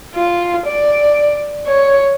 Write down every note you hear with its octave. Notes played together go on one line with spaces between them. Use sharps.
F4
D5
C#5